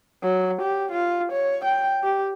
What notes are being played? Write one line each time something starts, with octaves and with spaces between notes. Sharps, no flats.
F#3
G4
F4
C#5
G5
G4